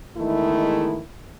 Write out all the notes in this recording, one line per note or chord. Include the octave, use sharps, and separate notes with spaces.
E2 D#3 G#3 A3 E4